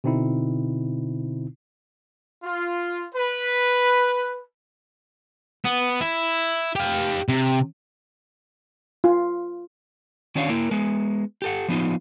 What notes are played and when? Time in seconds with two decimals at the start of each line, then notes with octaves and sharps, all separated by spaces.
0.04 B2 D3 C4 D#4 E4
2.43 F4
3.15 B4
5.65 B3
6.01 E4
6.76 G4 F5
7.29 C3
9.04 F4
10.35 D#3 C#4 D4 F#4 C#5 F5
10.49 A#3 E4 A#4
10.71 G#3 B3
11.42 G4 A4 F#5
11.68 F3 B3 D#4 F4